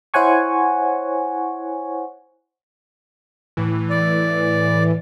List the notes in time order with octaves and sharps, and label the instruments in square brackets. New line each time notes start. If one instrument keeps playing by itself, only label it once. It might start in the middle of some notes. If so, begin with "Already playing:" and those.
[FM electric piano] E4 C5 C#5 F#5 G#5 C#6
[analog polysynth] A2 E3
[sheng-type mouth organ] D5